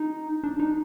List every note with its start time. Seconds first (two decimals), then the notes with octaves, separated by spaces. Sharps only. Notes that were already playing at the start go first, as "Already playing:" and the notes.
Already playing: D#4
0.44 D4
0.60 D#4